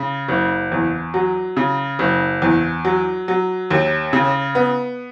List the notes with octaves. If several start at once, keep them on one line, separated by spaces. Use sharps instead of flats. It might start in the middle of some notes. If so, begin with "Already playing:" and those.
Already playing: C#3
F#1
E2
F#3
C#3
F#1
E2
F#3
F#3
D#2
C#3
B3